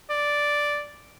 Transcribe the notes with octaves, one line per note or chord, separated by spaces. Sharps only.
D5